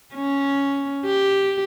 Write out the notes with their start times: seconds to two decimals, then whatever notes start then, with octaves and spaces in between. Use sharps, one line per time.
0.14 C#4
1.06 G4